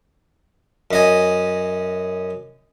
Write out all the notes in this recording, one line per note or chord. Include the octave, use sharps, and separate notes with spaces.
F#2 D#5 G#5